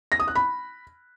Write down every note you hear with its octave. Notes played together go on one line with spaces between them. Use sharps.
A#6
D#6
F#6
B5